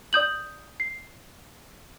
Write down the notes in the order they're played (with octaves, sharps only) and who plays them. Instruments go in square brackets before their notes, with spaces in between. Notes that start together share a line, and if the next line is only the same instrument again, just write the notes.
[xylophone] D5 D#6 G6 F#7
C7